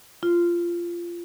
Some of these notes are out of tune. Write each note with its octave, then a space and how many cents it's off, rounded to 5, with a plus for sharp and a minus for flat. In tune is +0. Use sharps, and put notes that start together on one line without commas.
F4 -20